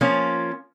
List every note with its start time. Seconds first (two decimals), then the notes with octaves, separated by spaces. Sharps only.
0.01 F3 A#3 C#4 F4